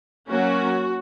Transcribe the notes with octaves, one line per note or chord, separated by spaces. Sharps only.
F#3 A#3 C#4 F#4